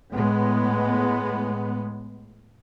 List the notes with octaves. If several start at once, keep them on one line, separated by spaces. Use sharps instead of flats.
A2 G#3 B3